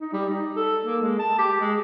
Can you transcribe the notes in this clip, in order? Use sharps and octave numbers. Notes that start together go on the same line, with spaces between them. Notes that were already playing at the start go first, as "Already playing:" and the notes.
D#4
G3
D#4
A4
A#3
G#3
A5
G4
G#3